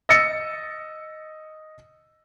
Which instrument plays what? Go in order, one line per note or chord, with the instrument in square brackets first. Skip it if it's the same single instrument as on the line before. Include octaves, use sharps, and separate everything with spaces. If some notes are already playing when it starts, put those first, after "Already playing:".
[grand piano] D#5 E6 A6 C#7